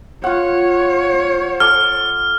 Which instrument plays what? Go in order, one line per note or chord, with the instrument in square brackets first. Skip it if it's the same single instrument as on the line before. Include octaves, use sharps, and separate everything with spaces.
[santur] F4 F#5 [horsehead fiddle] C#5
[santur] A4 D6 [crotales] F6